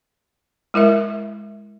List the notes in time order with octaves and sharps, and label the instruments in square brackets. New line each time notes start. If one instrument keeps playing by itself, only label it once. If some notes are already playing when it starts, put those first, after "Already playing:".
[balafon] G#3 E4 A#4 E5